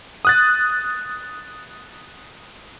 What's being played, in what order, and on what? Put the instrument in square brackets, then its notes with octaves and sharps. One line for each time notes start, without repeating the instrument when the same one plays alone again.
[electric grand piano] D#6 F#6 A6